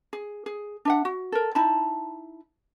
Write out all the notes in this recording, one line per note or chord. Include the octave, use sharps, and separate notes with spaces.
G#4
G#4
D4 E5 F#5
F#4
A4 A#4
D#4 E4 A5 B5